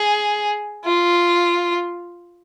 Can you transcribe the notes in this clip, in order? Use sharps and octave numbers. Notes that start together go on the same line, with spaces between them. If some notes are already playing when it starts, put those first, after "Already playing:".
Already playing: G#4
F4